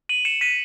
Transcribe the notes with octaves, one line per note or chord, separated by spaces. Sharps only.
D#7 F#7
C#7 E7
B6 D#7